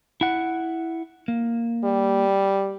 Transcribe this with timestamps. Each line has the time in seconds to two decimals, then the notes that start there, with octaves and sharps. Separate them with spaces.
0.21 E4 F#5
1.28 A#3
1.84 G3